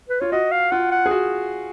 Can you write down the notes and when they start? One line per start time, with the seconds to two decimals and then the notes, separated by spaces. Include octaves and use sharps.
0.09 B4
0.20 F4 C#5
0.32 F#4 D#5
0.52 F5
0.71 F4 F#5
0.91 F#5
1.06 G#4
1.11 F#4